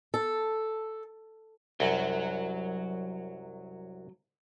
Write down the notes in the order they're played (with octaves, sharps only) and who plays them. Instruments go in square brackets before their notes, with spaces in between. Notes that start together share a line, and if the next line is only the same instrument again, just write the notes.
[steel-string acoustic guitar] A4
[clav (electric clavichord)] C2 F#2 [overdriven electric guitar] F#3